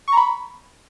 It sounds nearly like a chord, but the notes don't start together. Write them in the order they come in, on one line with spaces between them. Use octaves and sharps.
C#6 A#5 B5